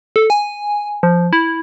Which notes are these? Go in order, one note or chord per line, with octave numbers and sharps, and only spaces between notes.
A4
G#5
F3
E4